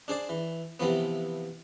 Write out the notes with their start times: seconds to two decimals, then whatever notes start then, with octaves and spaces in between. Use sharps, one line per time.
0.08 D4 G#4 C5 D5
0.29 E3
0.80 C3 E3 F3 B3